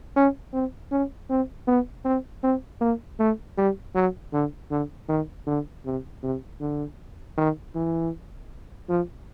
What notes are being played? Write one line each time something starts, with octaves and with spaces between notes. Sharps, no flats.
C#4
C4
C#4
C4
B3
C4
C4
A#3
A3
G3
F#3
D3
D3
D#3
D3
C3
C3
D3
D#3
E3
F3